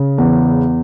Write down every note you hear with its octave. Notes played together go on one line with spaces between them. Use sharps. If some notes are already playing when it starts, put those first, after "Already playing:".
Already playing: C#3
E2